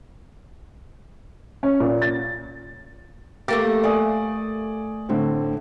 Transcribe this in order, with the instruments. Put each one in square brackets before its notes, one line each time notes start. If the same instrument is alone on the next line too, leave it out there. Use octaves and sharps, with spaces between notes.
[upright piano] C#4
A#2
A6
[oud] A3 A#3 G4 [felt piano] A6
[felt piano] D5 G#5 D#6
A2 D3 C4